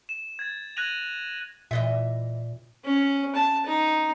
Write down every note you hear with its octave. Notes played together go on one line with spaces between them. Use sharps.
E7
G#6 A6
F#6 G#6 A#6 D#7 F7 F#7
A#2 E3 D#5 E5
C#4
A5
D#4